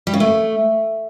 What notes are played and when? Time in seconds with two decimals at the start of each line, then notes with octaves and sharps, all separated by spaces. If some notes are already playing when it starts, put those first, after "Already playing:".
0.07 G3
0.14 C#3
0.20 A3